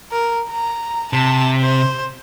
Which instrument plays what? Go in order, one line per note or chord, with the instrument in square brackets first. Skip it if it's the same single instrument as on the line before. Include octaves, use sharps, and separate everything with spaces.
[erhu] A#4
A#5
[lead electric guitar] C3 [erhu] A5
[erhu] C5